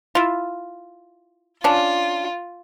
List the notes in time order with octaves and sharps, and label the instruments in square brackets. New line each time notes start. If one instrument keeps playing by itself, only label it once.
[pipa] E4 F4
[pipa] C#4 D4 [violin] F4